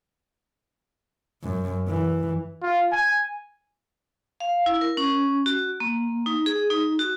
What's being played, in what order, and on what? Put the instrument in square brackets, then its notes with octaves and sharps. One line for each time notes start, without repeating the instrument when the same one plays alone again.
[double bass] F#2
E3
[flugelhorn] F4
G#5
[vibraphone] F5
E4
A#4
C#4
F#4
A#3
D#4
G#4
D#4
F#4